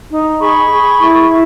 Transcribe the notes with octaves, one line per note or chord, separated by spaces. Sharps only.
D#4
G#4 B5 C#6
G#4
E4
E4